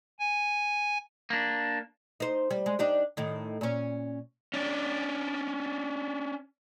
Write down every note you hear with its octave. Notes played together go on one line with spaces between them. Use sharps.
G#5
A#3 D4
D#4 C5
G3
G#3
D4 D#4 G4
A2 D#3
A#2 C#4
C#4 D4